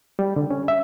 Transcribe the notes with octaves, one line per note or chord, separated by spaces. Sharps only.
G3
D3
C#4
E5